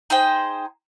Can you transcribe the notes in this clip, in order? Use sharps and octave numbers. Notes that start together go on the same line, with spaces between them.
D#4 G#4 C5 G5